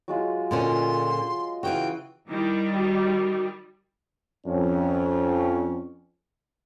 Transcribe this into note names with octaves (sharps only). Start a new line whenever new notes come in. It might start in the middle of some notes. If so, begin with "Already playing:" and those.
F#3 G#3 F4
A#2 D3 C#4 D#5 C6
C#3 E3 F4 F#4 G5
D#3 G3 E4
F#4
F2 C#4